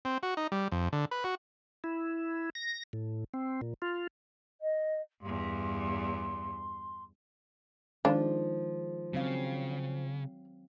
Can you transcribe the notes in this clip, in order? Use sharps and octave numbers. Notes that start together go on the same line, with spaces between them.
C4
F#4
D#4
G3
F2
D3
B4
F#4
E4
A#6
A2
C4
A#2
F4
D#5
E2 G2 C6
D#3 F3 G#3 D4 F4
C#3 F#3 C4 F5